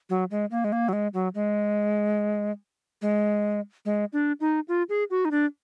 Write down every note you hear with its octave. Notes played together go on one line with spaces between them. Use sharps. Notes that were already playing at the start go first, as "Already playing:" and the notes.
F#3
G#3
A#3
G#3
A#3
F#3
G#3
F#3
G#3
G#3
G#3
D4
D#4
F4
G#4
F#4
D#4
D4